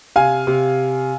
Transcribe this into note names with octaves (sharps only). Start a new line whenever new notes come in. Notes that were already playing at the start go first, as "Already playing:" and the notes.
C3 F5 G#5
C3